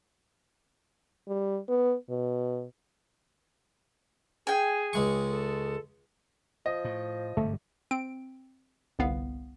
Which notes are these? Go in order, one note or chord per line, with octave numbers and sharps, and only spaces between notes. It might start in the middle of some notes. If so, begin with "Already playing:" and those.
G3
B3
B2
G#4 G5 G#5
C#2 G#3 C#6
A4
F3 D#5
A2
G1 G#2 C3 A3
C4 D7
G1 C2 B3 F5